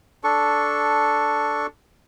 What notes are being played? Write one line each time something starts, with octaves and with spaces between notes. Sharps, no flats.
D4 A4 C#6